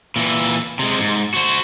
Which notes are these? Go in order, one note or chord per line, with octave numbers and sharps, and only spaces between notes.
A#2 E3
C3 G#3
G#2
F#4 C5